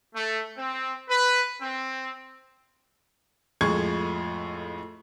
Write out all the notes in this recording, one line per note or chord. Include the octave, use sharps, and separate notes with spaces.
A3
C4
B4
C4
F2 A2 G#3 C#6 G#6